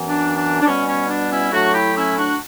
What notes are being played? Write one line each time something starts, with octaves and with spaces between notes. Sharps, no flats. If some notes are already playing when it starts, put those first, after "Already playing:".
Already playing: F#2 E3 B3
D4
D4
D4
B2 G3 B3 C#4
C#4
D4
C#4 E4
A2 F#3 A3 D4 F#4
E4 G4
C#4 E4
D4 F#4